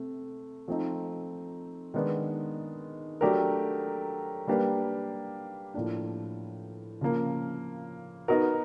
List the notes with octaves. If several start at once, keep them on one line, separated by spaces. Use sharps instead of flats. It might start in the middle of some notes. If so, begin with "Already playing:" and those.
Already playing: C3 A3
F3 A3 C4 D#4
D#3 G#3 B3 D4
F#3 A3 D4 G4 A#4
G3 A#3 D4 G4 B4
A2 F3 A#3 D4
C#3 F3 A#3
B3 D#4 F#4 A#4